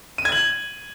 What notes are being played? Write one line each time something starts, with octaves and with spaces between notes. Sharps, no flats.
D#7
G#6
F#7